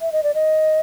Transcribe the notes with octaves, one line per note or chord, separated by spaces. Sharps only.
E5
D#5
D5
D#5